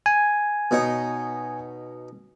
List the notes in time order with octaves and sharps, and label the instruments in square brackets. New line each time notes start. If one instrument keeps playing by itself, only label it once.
[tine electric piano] G#5
[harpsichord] B2 D#4 C#5